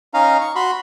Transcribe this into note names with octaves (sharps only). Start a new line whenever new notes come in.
C#4 D#4 F5 A#5
C#6
F#4 B5 C6